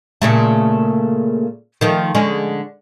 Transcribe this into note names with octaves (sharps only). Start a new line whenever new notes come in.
A#2 C#3 A3
D#3 F3 A3
D3 G#3 C#4